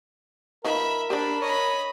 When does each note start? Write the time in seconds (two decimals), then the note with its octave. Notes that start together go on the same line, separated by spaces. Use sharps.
0.64 F3 D#4 A#4 B4 E5 B5
1.10 D4 G4 C5 D5 B5
1.42 C#5 D#5 B5